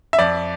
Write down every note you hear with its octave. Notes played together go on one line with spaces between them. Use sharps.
E5
F2 D5